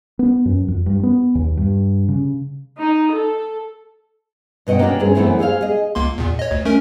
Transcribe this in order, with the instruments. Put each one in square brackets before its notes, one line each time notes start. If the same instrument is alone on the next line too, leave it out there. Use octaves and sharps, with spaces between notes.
[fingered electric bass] B3
F#2
F2
G2
B3
D#2
G2
C#3
[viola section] D#4
A4
[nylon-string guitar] G2 B2 D#5 F#5 G5
A#3 C#4 D4 F#4 G5
D2 G2 C#4 G#4
F#2 E3 A3 B3 C4 E4
G#4 C5 C#5 F5
G#4 D#5
[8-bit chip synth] C#2 A#3 C6
E2 A#2
C#5 D#5
D2
A3 C#4 A#4